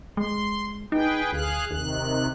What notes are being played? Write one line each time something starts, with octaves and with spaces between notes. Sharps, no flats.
G#3 C6
D#4 G#4 B4 G5
D2 G#4 F5 F#6
D#2 C3 D#3 F#6